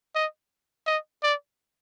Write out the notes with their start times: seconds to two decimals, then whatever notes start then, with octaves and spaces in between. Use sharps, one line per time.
0.15 D#5
0.86 D#5
1.23 D5